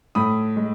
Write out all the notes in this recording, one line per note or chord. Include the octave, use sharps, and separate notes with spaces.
A2 B5 D#6
G#3